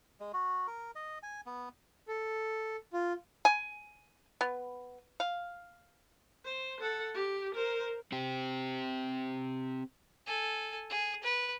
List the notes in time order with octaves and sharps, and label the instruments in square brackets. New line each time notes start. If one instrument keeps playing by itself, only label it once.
[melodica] G#3
F#4
A#4
D#5
G#5
B3
[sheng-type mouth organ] A4
F4
[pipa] G#5
B3
F5
[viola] C5
A4 F#5
G4
A#4 C5
[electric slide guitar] C4 G4
[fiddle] A4 G#5
G#4
B4